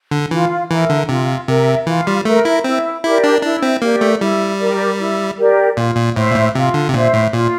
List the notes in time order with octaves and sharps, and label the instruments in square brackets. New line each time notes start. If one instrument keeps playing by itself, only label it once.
[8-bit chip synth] D3
[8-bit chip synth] E3 [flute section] F4
[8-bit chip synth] E3 [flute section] A#4 E5
[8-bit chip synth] D3
[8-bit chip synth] C3 [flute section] F4
[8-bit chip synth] C3 [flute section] A#4 E5
[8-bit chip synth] E3 [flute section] F4
[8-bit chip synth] G3
[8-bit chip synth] A3 [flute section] A#4 E5
[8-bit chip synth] E4
[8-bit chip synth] C4 [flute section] E4
[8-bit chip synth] E4 [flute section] G4 A#4 D5
[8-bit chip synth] D4
[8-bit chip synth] D4 [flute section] E4
[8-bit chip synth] C4
[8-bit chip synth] A#3 [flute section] G4 A#4 D5
[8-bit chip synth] A3
[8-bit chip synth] G3 [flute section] E4
[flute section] G4 A#4 D5
E4
G4 A#4 D5
[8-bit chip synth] A#2 [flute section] F4
[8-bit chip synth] A#2
[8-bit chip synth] A2 [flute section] C5 E5
[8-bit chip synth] A#2
A2
[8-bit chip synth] C3 [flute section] F4
[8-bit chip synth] D3
C3
[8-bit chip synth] A#2 [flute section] C5 E5
[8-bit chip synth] A2
[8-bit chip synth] A#2 [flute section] F4